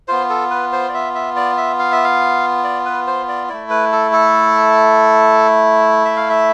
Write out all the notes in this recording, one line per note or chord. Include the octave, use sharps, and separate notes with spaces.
B3 F4 C5
A4
B4
C5
D5
E5
E5
D5
E5
F5
E5
F5
D5
B4
C5
D5
A3 E4 D5
B4
A4
A4
E5
F5
E5